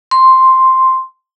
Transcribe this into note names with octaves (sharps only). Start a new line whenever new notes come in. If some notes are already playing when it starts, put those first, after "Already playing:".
C6